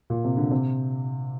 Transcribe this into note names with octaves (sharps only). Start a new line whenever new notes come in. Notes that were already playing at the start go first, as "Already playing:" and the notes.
A#2
C3
D3
C3